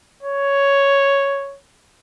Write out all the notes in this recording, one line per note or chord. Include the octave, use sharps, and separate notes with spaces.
C#5